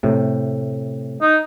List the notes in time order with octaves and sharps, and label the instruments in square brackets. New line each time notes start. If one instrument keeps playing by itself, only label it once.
[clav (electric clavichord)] A2 C3
[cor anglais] D#4